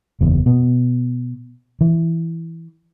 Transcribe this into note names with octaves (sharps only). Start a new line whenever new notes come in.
F#1 E2
B2
E3